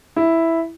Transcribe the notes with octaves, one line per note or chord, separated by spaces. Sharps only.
E4